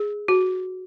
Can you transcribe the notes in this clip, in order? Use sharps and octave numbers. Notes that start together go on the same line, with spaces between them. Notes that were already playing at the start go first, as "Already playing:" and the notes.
Already playing: G#4
F#4